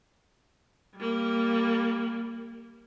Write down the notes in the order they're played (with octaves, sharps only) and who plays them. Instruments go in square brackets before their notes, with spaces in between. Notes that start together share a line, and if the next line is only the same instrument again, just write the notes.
[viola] G3 A#3